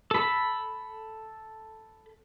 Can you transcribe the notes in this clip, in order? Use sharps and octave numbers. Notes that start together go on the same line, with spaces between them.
A4 B5